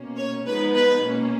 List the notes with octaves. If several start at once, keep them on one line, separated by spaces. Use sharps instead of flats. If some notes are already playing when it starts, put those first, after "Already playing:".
Already playing: B2 A#3 C#4
C#5
F3 G#3 B3 D#4 B4
B4
B2 A#3 C#4